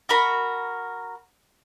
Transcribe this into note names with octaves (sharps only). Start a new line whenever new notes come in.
F#4 A#4 B5